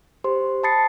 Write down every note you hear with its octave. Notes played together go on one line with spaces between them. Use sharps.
G4 C5 C6
A5 B5 D#6 A6 C7 C#7